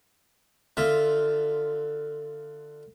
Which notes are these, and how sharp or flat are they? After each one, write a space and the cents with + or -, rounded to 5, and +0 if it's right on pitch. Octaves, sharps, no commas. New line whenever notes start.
D3 +20 F4 +0 E5 +0